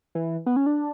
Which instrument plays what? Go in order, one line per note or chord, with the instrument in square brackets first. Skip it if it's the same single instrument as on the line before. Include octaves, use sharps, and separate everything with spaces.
[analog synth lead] E3
B3
C#4
D4